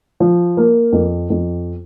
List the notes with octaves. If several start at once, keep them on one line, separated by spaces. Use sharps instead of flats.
F3
A#3
F2
F2